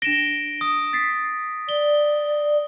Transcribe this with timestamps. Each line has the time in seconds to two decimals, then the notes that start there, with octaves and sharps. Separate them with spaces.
0.02 D4 A#6 D7 E7 G7
0.61 D#6
0.93 A6 B6 C7
1.69 D5 G7